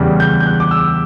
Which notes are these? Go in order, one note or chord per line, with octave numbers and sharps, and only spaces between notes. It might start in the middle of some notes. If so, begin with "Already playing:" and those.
Already playing: E2 C#3 G3
G6
G6
F#6
D6
E6